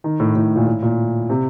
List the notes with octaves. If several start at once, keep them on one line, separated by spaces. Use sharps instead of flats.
D#3
A2
A2
A#2
A2
A#2
C3